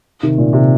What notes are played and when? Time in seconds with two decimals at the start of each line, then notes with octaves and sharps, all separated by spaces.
0.23 C3 D#3
0.38 A#2
0.53 C3